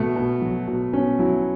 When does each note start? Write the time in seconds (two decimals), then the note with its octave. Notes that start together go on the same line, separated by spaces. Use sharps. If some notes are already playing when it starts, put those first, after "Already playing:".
Already playing: B2 A3
0.16 B2
0.42 F#3
0.67 B2
0.93 B2 C#4
1.19 F#3 E4